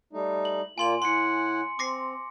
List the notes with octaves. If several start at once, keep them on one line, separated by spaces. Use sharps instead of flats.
G3 A3 D#4
F#7
A#2 A#3 F4 G#5 C6 F#7
A2 F#5 G#5 C6 C#7
C4 D6 A#6 C7